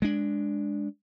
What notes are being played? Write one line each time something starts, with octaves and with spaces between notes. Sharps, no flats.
G#3 D4